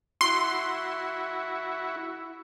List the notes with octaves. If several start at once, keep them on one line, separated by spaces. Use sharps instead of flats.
E4 F#4 C6